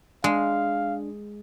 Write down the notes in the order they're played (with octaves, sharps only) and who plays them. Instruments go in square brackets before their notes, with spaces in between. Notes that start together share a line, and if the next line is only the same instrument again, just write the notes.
[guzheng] G#3 [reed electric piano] D4 [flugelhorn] F5